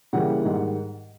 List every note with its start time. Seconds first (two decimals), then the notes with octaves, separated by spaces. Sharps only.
0.13 C#3 E3 G3 A#3 F#5
0.44 G#2 D#3 G3